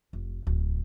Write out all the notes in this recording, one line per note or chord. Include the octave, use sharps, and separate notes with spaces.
F1
D1